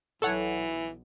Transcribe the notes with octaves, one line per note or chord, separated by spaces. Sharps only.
B1 E3 A4 C#5 F#5